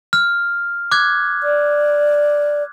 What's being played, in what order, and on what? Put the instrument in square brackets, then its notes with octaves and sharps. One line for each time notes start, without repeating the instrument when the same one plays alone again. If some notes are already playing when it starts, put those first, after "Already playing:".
[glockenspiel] F6
D6 F#6 G#6
[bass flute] D5